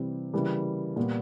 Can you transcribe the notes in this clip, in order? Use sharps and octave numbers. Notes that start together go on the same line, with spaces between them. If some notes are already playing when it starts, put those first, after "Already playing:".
Already playing: C3 E3 G3 C4
C#3 E3 G3 A#3
A#2 G3 B3